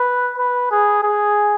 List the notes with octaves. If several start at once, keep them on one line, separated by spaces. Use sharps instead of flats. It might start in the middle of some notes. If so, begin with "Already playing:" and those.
Already playing: B4
B4
G#4
G#4